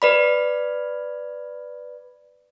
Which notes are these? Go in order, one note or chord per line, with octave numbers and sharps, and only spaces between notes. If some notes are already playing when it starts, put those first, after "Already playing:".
B4 D5 B5